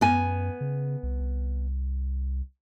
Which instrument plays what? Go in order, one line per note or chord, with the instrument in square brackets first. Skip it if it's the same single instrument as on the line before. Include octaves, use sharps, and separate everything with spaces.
[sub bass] F#2 [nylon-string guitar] B3 G#5
[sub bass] C#3
C2
C2